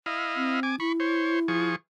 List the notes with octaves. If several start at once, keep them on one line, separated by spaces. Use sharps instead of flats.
E4 D#5 F5
C4
G#5 D6
E4 B5 C#6
C5 C#5
F3 G#4 C#6